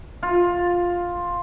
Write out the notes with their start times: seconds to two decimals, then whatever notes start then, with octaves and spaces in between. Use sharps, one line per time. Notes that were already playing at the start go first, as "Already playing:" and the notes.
0.23 F4